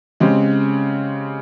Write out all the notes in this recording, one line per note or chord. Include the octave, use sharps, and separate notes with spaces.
C#3 G#3 C4 G4